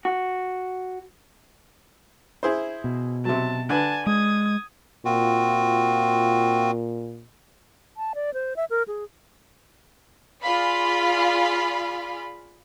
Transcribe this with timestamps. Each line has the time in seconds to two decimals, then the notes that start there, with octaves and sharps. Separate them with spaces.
0.05 F#4
2.43 E4 G#4 C5
2.84 B2
3.25 C3 F#3 A5
3.69 D3 D4 B4 G#5 A5
4.06 G#3 D#6 G#6
5.05 A#2 C4 F4 F#4
7.97 A5
8.15 D5
8.34 C5
8.56 E5
8.70 A#4
8.88 G#4
10.42 F4 G#4 D5 F5 B5